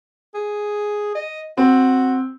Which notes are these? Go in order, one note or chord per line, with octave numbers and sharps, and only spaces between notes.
G#4
D#5
C4 F#4